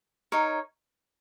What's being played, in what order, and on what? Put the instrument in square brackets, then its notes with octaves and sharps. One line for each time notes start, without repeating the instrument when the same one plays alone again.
[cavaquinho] D#4 A#4 C#5